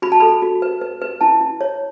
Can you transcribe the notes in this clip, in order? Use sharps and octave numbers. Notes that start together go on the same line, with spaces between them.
F#4 B5
A5
A4 B5
F#4
B4
B4
B4
E4 A5
E4
C#5